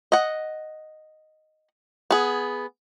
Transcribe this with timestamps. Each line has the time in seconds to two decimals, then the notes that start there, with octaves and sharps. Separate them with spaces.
0.12 D#5 F#5
2.11 B3 G#4